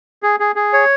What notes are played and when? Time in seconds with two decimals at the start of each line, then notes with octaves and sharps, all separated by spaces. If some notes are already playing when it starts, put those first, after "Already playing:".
0.23 G#4
0.40 G#4
0.56 G#4
0.73 C#5